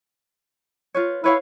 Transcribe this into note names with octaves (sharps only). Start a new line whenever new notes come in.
F4 B4 C#5
E4 B4 C#5 F5